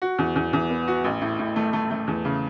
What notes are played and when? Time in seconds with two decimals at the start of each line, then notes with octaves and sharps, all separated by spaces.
0.02 F#4
0.18 E2
0.36 E2
0.53 E2
0.70 B3
0.87 F#4
1.04 A1
1.21 A2
1.39 A2
1.56 A3
1.73 A3
1.91 A3
2.08 E2
2.25 C#3